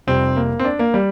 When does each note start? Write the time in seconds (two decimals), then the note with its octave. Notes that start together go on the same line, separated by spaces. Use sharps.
0.07 F1 F2 C3 G3 C4
0.36 A#3
0.59 C4
0.65 D4
0.79 A#3
0.94 G3